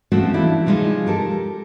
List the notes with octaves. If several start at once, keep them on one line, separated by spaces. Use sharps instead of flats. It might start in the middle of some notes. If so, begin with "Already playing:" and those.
F3 A3 C4 C#4 F#4
E3 A3 D4 E4 F4
C3 F3 G#3 D#4 F4
G4 A4 A#4